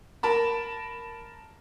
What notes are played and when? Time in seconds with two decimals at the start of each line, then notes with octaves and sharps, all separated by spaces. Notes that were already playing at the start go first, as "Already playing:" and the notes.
0.23 A#4 A5 B5